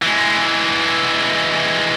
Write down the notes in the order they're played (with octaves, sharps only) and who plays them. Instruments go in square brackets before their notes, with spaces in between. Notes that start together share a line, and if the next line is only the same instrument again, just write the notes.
[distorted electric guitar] E3 G#3